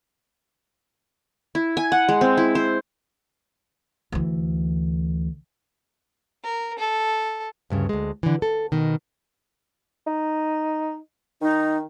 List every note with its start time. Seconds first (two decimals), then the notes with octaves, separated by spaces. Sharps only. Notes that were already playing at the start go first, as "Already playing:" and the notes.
1.55 E4
1.77 G#5
1.92 F#5
2.09 G#3
2.21 C4
2.37 E4
2.55 C5
4.12 D2 E3
6.43 A#4
6.78 A4
7.70 D2 G2 C#3
7.89 D2 G#3
8.23 D3 E3
8.42 A4
8.72 B2 D#3
10.07 D#4
11.41 D#3 D#4